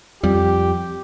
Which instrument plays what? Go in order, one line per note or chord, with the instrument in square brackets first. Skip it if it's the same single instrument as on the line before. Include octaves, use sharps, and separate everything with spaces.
[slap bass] F2 G3 [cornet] G4